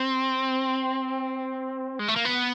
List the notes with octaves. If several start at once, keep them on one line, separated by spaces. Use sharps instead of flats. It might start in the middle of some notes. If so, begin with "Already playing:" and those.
Already playing: C4
G#3
A3
A#3
B3